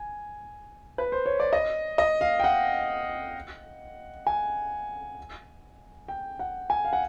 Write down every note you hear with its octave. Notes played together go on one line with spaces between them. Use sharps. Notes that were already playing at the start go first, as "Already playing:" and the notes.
Already playing: G#5
B4
C5
C#5
D5
D#5
D#5
F5
G5
F#5
G#5
G5
F#5
G#5
F5
F#5